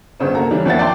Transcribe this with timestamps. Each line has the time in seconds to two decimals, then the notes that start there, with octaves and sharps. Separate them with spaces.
0.20 G1 C#3 C5
0.34 A#3 F#4 A4 A#5
0.51 E3 G3 C#4 D4
0.65 D#2 F3 D4 E5 F#5 A6
0.79 D5 G5 A5 C6